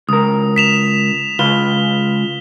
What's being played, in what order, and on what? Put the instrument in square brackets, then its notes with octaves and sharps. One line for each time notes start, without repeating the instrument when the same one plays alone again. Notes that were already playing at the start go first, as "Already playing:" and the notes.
[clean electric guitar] C#2 A#4 [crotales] D#6
[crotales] B6 E7 F7
[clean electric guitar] C#2 F4 B4 [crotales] G7